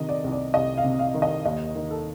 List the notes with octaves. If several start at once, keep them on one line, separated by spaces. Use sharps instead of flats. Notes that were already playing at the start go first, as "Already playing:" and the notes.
Already playing: C3 D#3 D#5
D5
C2
D5
C2 D#5
F5
C3
F5
D#3
D#5
D#2 D#5
D#3
A4